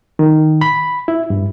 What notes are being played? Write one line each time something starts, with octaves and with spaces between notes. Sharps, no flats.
D#3
B5
E4
G2